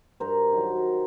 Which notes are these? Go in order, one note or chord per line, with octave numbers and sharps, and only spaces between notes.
G2 A#4 C5
D#3 F#3